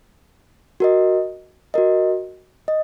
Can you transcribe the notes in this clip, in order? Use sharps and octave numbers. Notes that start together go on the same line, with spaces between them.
F#4 A#4 D#5
F#4 A#4 D#5
D#5